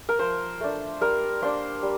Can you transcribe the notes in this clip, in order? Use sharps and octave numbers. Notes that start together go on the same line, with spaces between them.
A#4
F3 C5
A3 D4
G3 A#4
A#3 D4 C5
G3